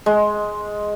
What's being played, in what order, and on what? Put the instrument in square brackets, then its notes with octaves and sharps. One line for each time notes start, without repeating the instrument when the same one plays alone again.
[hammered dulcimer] G#3